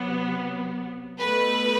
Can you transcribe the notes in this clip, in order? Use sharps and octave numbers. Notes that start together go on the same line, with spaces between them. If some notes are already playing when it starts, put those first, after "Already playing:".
Already playing: C3 F#3 B3
B2 A3 B4